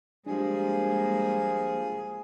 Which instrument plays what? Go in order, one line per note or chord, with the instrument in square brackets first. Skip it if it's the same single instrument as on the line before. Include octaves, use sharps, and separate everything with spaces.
[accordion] F3 [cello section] G3 G#3 A#3 [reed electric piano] D4 G4 [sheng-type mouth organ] G#4